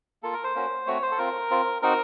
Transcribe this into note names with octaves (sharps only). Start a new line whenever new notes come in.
A#3 F4 A4
A#4
C5
A#3 C#4 F#4
A3 C4 F#4 C#5
C5
A4
C4 F4 A#4
C4 F4
C4 D#4 F#4 A#4